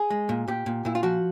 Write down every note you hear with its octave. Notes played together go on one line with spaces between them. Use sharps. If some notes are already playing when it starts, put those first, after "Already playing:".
Already playing: G#4
G#3
A#2
A#2 G4
A#2
A#2 E4
F4
F3 F#4